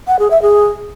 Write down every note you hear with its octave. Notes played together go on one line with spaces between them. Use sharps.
F#5
G#4
E5
G#4